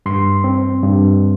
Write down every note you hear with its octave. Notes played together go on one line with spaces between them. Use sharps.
G2 C6
C4
G2